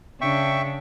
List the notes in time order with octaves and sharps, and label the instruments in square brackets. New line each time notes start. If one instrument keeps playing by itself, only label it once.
[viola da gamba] C#3 D4 [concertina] E5 G5 C#6